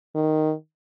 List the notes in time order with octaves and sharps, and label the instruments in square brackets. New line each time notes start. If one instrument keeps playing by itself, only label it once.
[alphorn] D#3